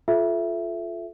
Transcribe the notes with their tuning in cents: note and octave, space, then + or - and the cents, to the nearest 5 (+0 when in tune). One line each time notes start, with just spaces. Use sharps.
F4 +0 A4 -20 E5 +10